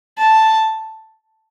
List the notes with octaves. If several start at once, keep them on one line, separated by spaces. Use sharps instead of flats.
A5